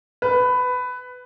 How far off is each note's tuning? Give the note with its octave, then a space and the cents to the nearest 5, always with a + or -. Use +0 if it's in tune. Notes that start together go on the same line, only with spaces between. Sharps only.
B4 +15